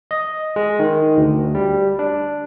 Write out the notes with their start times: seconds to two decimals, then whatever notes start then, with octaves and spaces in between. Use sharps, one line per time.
0.11 D#5
0.56 G#3
0.79 D#3
1.17 D2
1.55 G3
1.99 D4